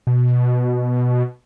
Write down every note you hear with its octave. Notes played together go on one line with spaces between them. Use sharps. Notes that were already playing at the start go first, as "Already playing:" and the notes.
B2